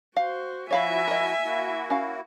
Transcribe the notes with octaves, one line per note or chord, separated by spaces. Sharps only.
F#4 C5 F5
F3 E4 F#4 C#5 E5 F5 G#5 B5
A#4 D#5
A#3 E4 F#4
C#4 F5